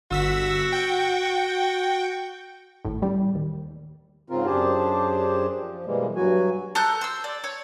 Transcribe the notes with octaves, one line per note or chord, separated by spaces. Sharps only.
G1 F#4 E6 B6
G5
G#1 A2
A1 G3
D#2
G#2 C#3 C4 F4 A#4
F#2 D4 G4 G#4 C5 A5
F3
B2 E3 G3 G#3 A#3
G2 F#3 F#4 G#5
A4 A#5 F#6 G6
C5 E6
D5
C#5